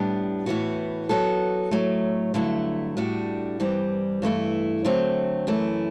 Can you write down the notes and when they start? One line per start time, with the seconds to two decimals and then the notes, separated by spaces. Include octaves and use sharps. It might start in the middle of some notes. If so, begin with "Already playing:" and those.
Already playing: A2 G3 B3 D4
0.46 A2 E3 B3 F#4
1.09 F#3 B3 F#4 A4
1.71 A2 F#3 A3
2.34 G2 D3 F#3 A3 E4
2.97 A2 G3 D4 F#4
3.60 G2 E3 G3 C4
4.22 G2 E3 A3 E4
4.85 D3 F#3 A3 C4
5.47 F#2 E3 A3 E4